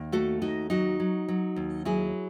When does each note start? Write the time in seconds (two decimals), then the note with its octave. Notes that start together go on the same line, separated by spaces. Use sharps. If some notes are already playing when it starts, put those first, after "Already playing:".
Already playing: D#2
0.12 A3 F#4 A4
0.42 D#2 D#4 F#4
0.70 F#3 D#4 F#4
1.00 F#3
1.28 F#3
1.56 D#2
1.85 F#3 E4 G#4